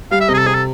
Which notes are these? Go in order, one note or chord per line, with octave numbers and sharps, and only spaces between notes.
G3 F5
E5
C3 D#5
G#4
A4
C3 G#4
A4